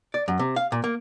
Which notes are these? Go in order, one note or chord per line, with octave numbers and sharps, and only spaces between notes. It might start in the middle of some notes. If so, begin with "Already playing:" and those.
D5
F#2
C3
F5
A#2
A#3